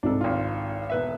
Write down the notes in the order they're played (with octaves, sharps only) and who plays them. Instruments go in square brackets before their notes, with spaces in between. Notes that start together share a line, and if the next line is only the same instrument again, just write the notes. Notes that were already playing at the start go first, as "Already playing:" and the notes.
[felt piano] C2 G#2 [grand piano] D4 A4
[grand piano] G#1 F4
E1 B4 E5